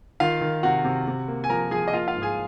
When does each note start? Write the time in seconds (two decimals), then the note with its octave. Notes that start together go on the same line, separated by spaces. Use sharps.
0.20 D#3 F4 F5
0.41 D#3
0.63 C3 F#4 F#5
0.84 C3
1.07 C3
1.28 A#3
1.44 G#5
1.49 F3 A#4 A#5
1.71 F3 G#4 G#5
1.88 D#5
1.93 A#3 F4 F5
2.08 F4 F5
2.15 G#2
2.22 G#4 G#5